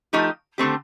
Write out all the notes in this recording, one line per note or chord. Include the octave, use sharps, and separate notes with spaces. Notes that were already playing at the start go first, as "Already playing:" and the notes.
F3 A3 D#4 G4
D3 A3 C4 G4